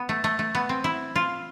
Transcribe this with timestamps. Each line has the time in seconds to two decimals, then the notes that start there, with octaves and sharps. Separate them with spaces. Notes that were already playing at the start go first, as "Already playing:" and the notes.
Already playing: B3
0.09 A3
0.24 A3
0.39 A3
0.55 B3
0.69 C4
0.84 E4
1.15 F4